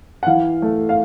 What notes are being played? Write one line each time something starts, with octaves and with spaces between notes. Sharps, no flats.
F#5
E3 F5
A3
F5